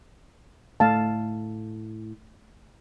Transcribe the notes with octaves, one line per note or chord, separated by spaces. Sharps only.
A2 A3 F5 A5